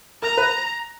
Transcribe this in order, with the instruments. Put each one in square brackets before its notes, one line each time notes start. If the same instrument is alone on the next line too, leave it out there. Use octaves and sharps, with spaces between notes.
[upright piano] A#4 [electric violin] A#5
[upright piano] B4